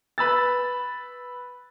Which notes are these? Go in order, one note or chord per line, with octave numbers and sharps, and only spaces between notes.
B4 B5 E6 A6